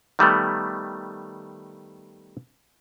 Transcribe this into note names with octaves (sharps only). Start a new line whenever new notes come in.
D#3 G3 A3 B3